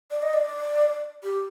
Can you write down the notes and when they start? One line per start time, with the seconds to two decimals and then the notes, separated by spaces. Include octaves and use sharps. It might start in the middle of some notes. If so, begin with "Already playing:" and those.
0.11 D5
0.22 D#5
0.33 D5
1.23 G4